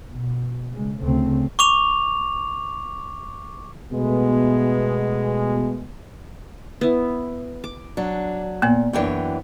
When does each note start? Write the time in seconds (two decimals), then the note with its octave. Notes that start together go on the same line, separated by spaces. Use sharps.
0.14 B2
0.72 C#3 G#3
1.01 D2 C#3 A3 C4
1.59 C#6 D6 F7
3.92 B2 G#3 A3 B3
6.81 B3 E4
7.64 D6
7.97 F#3 D4
8.62 A#2 A#3 B3
8.93 F#2 E3 D4 C#5 G5